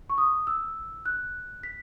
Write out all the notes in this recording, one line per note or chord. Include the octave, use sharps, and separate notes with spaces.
C#6
D#6
E6
F#6
B6